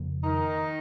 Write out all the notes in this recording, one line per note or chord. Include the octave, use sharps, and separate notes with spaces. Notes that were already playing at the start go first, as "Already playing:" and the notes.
Already playing: F2 C#3 F3 A#3
D#3 D#4